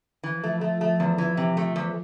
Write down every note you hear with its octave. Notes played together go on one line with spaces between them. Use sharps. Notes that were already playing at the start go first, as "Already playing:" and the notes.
E3 F3
A3
F3 A3
A3
E2
E3
C3
A3
E2